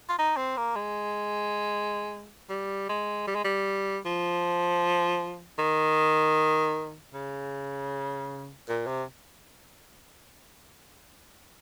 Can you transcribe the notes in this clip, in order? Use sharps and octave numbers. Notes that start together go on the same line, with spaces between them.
F4
D#4
C4
A#3
G#3
G3
G#3
G3
G#3
G3
F3
D#3
C#3
A#2
C3